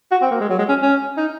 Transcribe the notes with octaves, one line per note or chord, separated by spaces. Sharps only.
F#4
C4
A#3
G#3
F#3
G#3
C#4
C#4
D#4